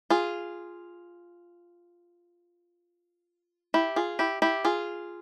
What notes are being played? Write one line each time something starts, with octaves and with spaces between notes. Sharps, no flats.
F4 G#4
E4 G4
F4 G#4
E4 G4
E4 G4
F4 G#4